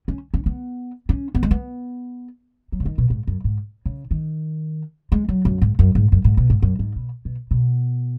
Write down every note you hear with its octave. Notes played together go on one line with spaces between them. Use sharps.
C#4
C#4
B3
C#4
B3
G#3
B3
F#3
C#3
D#3
B2
G#2
F#2
G#2
C#3
D#3
G#3
F#3
F#2
G#2
F#2
G#2
F#2
G#2
B2
G#2
F#2
G#2
B2
B2
B2